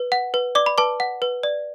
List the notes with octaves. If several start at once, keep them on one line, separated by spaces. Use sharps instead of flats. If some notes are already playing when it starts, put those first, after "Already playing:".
Already playing: B4
F#5
B4
D5 D6
B5
B4 A5 D6
F#5
B4
D5